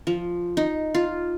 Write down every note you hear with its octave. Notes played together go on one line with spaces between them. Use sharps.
F3
D#4
F4